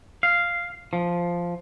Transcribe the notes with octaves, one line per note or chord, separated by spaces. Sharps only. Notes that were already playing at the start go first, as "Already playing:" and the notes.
F5
F3